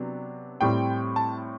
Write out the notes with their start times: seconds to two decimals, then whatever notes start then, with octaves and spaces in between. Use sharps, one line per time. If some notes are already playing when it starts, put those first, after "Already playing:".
Already playing: C3 F#3 B3 D4
0.61 A2 G3 C4 G5
1.16 A5